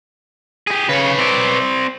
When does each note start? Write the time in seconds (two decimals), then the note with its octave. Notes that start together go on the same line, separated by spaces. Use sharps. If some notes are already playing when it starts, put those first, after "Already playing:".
0.67 G4 G#4
0.89 C#3 B4 C#5
1.19 C4 D5